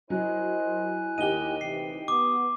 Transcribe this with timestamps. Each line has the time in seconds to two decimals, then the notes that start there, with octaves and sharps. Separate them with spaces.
0.10 F#3 E4 A#4 C5 D#5 G#5 F#6
1.18 D#2 D#3 D#4 G4 D#7 G7
1.61 D2 C3 E3 G5 C7
2.08 B3 G4 D6 D#6